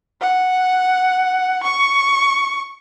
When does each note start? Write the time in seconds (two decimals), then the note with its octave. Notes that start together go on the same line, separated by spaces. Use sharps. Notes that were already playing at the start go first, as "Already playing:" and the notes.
0.21 F#5
1.63 C#6